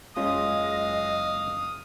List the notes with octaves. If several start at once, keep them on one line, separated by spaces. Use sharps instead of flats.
F#1 G#3 C#4 F4 G#4 D#5 F5 D#6